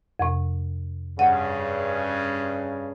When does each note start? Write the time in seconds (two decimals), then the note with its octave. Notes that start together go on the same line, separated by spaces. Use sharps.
0.19 F2 C3
1.19 G2 C#3 F#5